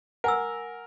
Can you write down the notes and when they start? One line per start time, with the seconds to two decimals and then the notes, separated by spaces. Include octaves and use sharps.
0.24 A#4 F#5 G#5 E6